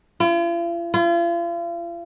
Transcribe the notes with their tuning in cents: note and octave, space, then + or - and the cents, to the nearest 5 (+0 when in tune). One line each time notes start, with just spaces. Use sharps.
F4 -45
F4 -40